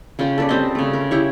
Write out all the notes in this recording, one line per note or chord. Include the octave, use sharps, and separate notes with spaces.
C#3 C#4 F4 G5
A4 B4 D5
G3 C4 D#5
C#3 A3
A#4
E4 G4 C#5